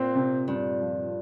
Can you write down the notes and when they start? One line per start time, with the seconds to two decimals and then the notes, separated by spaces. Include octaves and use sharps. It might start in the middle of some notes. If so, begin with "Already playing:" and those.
Already playing: A#2 C4
0.15 C3
0.48 G2 C3
0.81 F3